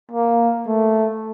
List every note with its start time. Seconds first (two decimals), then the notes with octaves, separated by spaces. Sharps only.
0.11 A#3
0.67 A3